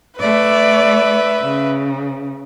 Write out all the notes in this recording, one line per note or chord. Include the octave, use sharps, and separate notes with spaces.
A3 B4 D5 E5
C#3